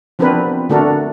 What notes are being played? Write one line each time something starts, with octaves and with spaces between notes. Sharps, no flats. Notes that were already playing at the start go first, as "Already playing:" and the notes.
F3 B3 C4 D4 A#4 B4
D3 A3 D4 F#4 A4 A#4